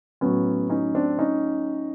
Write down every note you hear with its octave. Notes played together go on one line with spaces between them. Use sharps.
A2 F#3 B3 C#4
C#4 D#4
C4 D4
C#4 D#4